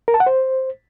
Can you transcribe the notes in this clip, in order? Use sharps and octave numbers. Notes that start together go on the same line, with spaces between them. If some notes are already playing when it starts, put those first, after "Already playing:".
A#4
A5
F#5
C5